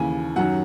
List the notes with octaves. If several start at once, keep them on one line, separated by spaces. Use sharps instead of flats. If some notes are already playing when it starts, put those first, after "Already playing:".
Already playing: D#2 C#3 E3 G#5
F#2 D#3 F#3 F#5